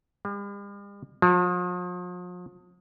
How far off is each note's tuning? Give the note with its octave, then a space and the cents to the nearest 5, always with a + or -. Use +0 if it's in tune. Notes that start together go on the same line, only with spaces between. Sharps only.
G3 +45
F3 +40